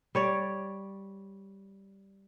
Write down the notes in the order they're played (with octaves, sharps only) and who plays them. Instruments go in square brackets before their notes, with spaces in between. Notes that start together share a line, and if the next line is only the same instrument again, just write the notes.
[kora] G3 C#5 D5